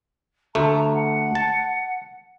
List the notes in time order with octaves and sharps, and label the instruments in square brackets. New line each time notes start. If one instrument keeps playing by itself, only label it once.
[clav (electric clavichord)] D2 A3 [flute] A#5
[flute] F#5
[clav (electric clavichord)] A5